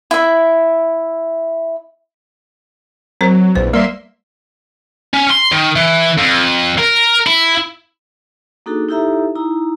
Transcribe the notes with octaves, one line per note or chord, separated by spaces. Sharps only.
E4 E5
F#3 C4 A#4 C5
A#1 E2 B4 C5
G3 A#3 D5 E5 C6
C#4
C6
D#3
E3
F2
A#4
E4
A#3 D4 D#4 F#4 G#4 A4
D#4 E4 G4 A4 E5 A#5
D#4 E4 A#5